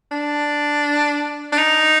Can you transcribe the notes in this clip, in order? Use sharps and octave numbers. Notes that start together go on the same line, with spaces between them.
D4
D4
D#4